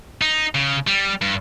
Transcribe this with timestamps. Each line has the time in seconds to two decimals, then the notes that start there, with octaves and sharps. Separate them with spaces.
0.21 D#4
0.55 C#3
0.87 G3
1.22 G2